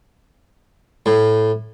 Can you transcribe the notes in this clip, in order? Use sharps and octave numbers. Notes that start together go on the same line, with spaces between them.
A2